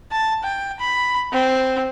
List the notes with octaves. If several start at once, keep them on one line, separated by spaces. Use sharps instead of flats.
A5
G5
B5
C4